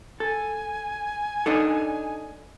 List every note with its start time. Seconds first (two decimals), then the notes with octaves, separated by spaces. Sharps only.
0.20 A4 G#5
1.46 D4 D#4 A4